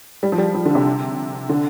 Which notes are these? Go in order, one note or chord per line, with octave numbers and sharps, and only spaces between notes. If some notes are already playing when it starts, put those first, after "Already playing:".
G3
F3
G3
F3
D3
C3
D3